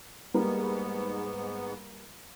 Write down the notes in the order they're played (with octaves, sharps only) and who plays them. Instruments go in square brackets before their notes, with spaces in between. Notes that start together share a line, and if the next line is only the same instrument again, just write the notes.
[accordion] G#2 B3 [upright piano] G3 A#3 B4